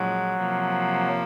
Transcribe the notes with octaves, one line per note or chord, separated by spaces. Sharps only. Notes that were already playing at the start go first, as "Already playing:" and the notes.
Already playing: A#2 F3 F#3 G#3 C#4
C3 F3 A#3